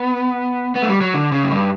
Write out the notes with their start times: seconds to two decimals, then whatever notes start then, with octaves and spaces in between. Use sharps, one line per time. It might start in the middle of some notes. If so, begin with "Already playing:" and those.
Already playing: B3
0.75 B3
0.82 A3
0.88 G3
1.01 F#3
1.14 D3
1.32 C#3
1.43 F#2
1.51 G2